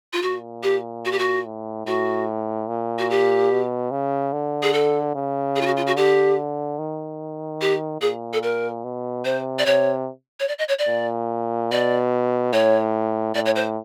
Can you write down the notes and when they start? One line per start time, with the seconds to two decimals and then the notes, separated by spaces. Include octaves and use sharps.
0.13 F4
0.22 A#2 F#4
0.63 G4
1.05 F#4
1.12 G4
1.19 F#4
1.46 A2
1.86 A2 F#4
2.68 A#2
2.99 F#4
3.10 G4
3.51 B2
3.91 C#3
4.33 D3
4.62 G#4
4.73 A4
5.15 C#3
5.56 G#4
5.61 F4
5.66 F#4
5.77 F4
5.87 F#4
5.96 D3 G4
6.78 D#3
7.61 G4
8.01 A#2 G#4
8.33 A4
8.43 A#4
8.84 B2
9.25 C3 C5
9.59 D5
9.66 C3 C#5
10.40 C#5
10.48 D5
10.59 D#5
10.68 C#5
10.79 D5
10.88 A#2
11.71 B2 D5
12.53 A2 C#5
13.35 A2 D5
13.46 C#5
13.56 C5